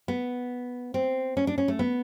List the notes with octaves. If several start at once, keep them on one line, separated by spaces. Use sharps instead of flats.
B3
C4
C#4
D4
C#4
A3
B3